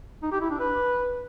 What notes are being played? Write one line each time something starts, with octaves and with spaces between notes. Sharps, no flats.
D#4
G4
E4
D4
B4